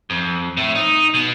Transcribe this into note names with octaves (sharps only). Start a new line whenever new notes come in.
F2
A2
D#4
B2